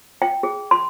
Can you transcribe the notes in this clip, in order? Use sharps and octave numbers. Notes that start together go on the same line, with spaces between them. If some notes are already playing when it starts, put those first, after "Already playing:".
G5
G#4
C6